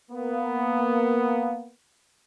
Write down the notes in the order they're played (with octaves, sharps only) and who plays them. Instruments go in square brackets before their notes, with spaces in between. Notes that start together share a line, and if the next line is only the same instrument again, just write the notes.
[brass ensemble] A#3 B3